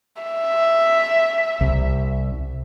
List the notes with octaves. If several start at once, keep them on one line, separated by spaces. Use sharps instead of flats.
E5
C2